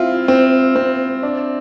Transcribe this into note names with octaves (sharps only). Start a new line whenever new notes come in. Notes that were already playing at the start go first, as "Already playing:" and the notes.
Already playing: C4 E4 F4
C4
C4
D4